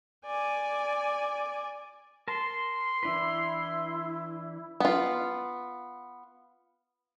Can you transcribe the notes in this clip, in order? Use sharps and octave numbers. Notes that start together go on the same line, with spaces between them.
D5 G#5
A#4 A5 C6
E3 D4 E4 B4
B3 F4